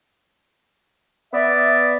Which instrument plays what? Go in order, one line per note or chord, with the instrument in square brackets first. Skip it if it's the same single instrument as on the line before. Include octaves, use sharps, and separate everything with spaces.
[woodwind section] B3 D5 E5